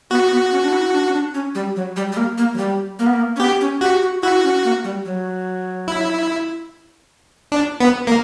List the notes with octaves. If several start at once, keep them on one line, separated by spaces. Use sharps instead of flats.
B3 F#4
B3
C#4
D4
E4
D4
C#4
D4
C#4
G3
F#3
G3
G3
A#3
A#3
F#3
G3
A#3
B3
A#3
C#4
B3 G4
C#4
F#4 G4
F#4
E4 F#4
C#4
A#3
G3
F#3
E4
D4
B3
A#3